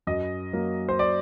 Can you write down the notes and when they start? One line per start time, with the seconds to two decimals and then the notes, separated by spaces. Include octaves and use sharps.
0.07 F#2 D#5
0.53 F#3 A#3
0.89 C5
0.99 D5